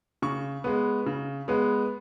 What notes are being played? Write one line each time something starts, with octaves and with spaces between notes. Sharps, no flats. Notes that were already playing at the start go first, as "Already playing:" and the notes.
C#3 C#6
G#3 B3
C#3
G#3 B3